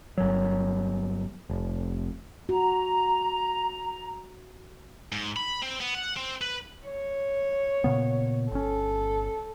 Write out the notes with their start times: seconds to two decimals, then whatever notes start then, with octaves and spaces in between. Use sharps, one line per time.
0.18 G1 F#3
1.49 F1
2.49 F#4 A#5
5.12 G#2
5.36 B5
5.63 C4
5.80 B3
5.95 F#5
6.17 C4
6.41 B4
6.86 C#5
7.84 A#2 C#3 B3
8.51 G1 C#4 A4